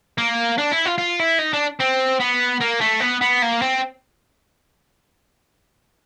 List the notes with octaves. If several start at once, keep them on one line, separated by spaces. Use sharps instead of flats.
A#3
D4
E4
F4
F4
E4
D#4
D4
C4
B3
A#3
A3
B3
B3
A#3
C4